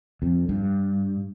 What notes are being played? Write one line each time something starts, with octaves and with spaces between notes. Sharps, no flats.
F2
G2